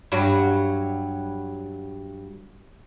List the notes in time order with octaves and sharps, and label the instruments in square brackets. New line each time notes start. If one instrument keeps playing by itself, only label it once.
[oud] G2 F#3 F#4